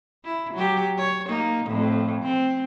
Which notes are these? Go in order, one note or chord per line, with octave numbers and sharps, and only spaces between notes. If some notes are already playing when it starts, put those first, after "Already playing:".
E4
F#3 G4
C#5
A#3 D#4
F2 A2
C4